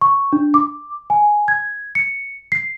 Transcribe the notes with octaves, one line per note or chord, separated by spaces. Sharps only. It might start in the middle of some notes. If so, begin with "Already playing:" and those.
C#6
D4
D6
G#5
G#6
C#7
C7